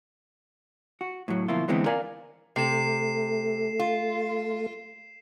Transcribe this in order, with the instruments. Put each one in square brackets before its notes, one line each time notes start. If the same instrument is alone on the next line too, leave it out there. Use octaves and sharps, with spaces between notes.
[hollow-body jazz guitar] F#4
A2 F#3
D2 B2 F3 A#3 E4 F4
D3 E3 G#3 B3 C4
A#4 D5 F5 G#5
[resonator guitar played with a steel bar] C3 [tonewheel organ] A3 [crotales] C7 E7
[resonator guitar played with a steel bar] F4